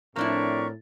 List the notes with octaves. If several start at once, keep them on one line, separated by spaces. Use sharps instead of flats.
A2 F3 C4 D4 E4 A#4 D5 C#6